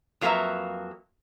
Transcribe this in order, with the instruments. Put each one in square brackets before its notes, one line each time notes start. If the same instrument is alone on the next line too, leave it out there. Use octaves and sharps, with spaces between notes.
[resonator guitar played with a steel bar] F2 F#3 A#3 C4 B4 E5